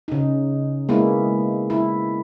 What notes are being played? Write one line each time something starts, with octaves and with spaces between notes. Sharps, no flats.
C#3 D#4
G#3 A#3 B3 E4
E4